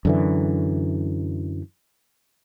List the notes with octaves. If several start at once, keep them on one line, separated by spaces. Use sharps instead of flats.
F#2 D3 E3